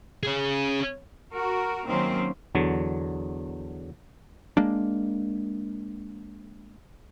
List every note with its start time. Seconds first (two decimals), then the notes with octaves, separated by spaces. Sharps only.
0.23 C#4 G#4
1.34 F#4 A#4
1.87 D#3 F#3 A#3 C4 C#4
2.55 E2 D3 F#3
4.57 G#3 A#3 D4